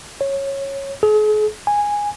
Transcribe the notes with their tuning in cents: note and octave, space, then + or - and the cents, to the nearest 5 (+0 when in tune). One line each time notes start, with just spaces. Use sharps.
C#5 -15
G#4 +40
G#5 -10